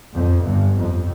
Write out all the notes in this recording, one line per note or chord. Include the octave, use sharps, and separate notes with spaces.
F2
G1 G2
F2